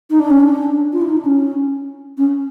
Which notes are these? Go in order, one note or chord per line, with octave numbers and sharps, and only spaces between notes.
D#4
D4
C#4
D4
F4
E4
D#4
D4
C#4
C#4